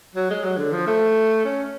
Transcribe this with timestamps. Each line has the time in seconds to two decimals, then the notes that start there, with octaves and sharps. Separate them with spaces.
0.15 F#3
0.30 G#3
0.43 F#3
0.58 D3
0.72 F3
0.87 A3
1.45 C#4